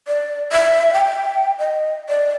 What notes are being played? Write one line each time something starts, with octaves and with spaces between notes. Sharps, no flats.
D5
E5
G5
D#5
D5